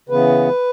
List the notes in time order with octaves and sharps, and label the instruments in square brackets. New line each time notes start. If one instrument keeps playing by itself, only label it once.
[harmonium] C#3 E3 B3 B4